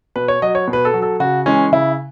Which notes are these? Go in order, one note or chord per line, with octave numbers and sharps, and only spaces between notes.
B2 B4
C#5
F#3 D#5
C#5
B2
B4
A4
F#3
A4
C#3 F#4
E3 G#3 C#4
C#3 E4